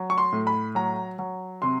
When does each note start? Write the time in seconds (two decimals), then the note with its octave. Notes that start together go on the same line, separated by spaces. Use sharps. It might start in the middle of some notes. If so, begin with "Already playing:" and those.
Already playing: F#3
0.10 C#6
0.18 C6
0.32 A2
0.47 B5
0.75 F#3 A#5
1.19 F#3
1.62 C3 C6